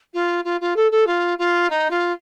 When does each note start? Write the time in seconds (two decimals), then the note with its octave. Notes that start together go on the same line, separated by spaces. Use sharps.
0.13 F4
0.44 F4
0.60 F4
0.76 A4
0.91 A4
1.06 F4
1.38 F4
1.70 D#4
1.90 F4